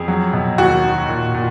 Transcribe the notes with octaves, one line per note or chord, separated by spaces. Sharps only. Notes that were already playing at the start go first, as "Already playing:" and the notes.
Already playing: F2 G#4
F#3
B2
D#2 F#4
D#3
A#2
A#2